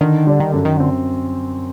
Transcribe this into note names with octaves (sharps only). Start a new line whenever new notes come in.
D3 D#3
D3 G3 D4
D#3
F#2 D3
D#3
D3 C4